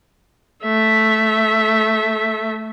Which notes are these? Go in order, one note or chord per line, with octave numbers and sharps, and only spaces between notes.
A3 E5